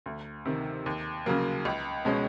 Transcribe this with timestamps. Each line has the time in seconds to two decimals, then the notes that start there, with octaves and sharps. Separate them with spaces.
0.06 D2
0.46 C3 D#3
0.86 D#2
1.26 C#3 F#3 A#3
1.65 C#2
2.05 B2 G#3 C#4